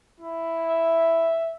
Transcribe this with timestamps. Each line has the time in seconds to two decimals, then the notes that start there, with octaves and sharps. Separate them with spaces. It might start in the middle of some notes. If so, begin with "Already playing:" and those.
0.20 E4
0.69 E5